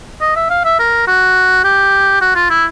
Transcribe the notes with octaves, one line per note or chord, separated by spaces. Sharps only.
D#5
E5
F5
E5
A#4
F#4
G4
F#4
F4
E4